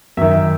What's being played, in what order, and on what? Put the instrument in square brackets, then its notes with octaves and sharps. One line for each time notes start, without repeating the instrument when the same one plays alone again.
[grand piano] F#2 D#3 E5